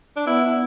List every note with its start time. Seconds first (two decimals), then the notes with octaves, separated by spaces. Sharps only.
0.16 D4
0.26 B3 E4